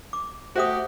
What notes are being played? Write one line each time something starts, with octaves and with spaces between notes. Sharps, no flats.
D6
A3 F#4 G4 C5 E5 D#6